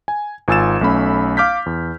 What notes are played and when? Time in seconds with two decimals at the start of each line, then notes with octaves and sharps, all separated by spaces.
0.08 G#5
0.48 G#1 F4 G#5 E6 A6 E7
0.81 B1 A3 C#4 B5
1.37 F5 D6 F6 G6 B6
1.66 E2